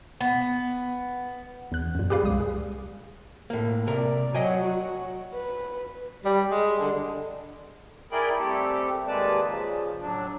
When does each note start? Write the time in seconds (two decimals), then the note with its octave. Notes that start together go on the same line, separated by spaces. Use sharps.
0.20 B3
1.72 E2 F#6
1.95 F#2 A#2
2.10 G4 G#4 B4 D5 F5
2.24 C2 G#3 D#6
2.40 G#4
3.50 A2 A#3
3.87 C3 A#4 D5
4.34 F#3 D#5 G5 G#5
4.64 F#4
5.34 B4
6.24 G3
6.51 G#3
6.79 D3
8.12 E4 G#4 A#4 D5 G5 B5
8.38 G3 A3 C4 G4 A4
9.07 D#2 G#3 A#3 B4 D5 A5
9.45 C#3 F3
10.01 A2 F#3 D4